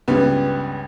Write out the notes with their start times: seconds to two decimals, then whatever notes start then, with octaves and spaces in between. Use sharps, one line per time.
0.08 C#2 G2 B3